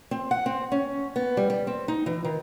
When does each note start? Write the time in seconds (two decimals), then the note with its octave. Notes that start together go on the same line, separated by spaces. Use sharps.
0.11 C4
0.31 F#5
0.46 C4
0.72 C#4
1.16 B3
1.37 G3
1.50 G3
1.67 C4
1.88 D#4
2.06 E3
2.24 D#3